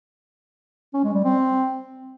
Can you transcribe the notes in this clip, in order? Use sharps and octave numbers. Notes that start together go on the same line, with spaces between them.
C#4
G#3
G3
C4